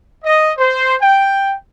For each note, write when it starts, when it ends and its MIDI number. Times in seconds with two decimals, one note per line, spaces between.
0.24 0.51 75
0.58 0.95 72
1.00 1.54 79